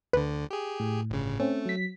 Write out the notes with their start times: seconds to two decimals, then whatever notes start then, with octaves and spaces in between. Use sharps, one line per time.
0.13 D2 D3 B4
0.50 G4 G#4
0.80 A2
1.10 G1 C#3
1.40 A3 C4 C#4
1.66 F#3 B6